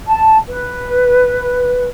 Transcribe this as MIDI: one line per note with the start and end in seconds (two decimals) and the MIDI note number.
0.08 0.37 81
0.48 1.85 71